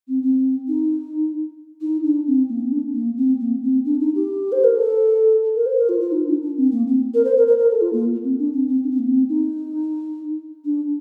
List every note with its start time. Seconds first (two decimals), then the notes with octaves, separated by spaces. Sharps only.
0.08 C4
0.23 C4
0.68 D#4
1.81 D#4
2.04 D4
2.27 C4
2.49 A#3
2.60 C4
2.72 D4
2.94 A#3
3.17 C4
3.40 A#3
3.63 C4
3.85 D4
4.00 D#4
4.15 G4
4.52 C5
4.64 A#4
4.76 A4
5.56 A#4
5.66 C5
5.77 A#4
5.89 F4
6.00 F4
6.12 D#4
6.27 D4
6.42 D4
6.57 C4
6.72 A#3
6.88 C4
7.14 A#4
7.25 C5
7.37 A#4
7.47 A#4
7.58 A#4
7.71 A4
7.81 F4
7.93 A#3
8.23 C4
8.39 D4
8.53 C4
8.68 C4
8.84 D4
8.91 C4
8.99 A#3
9.07 C4
9.29 D#4
10.65 D4